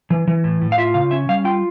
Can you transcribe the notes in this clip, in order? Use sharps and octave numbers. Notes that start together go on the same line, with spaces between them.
E3
E3
A2
A2
F5
F4 E5
C#3 F5
C#4 E5
G3 F5
F4 G5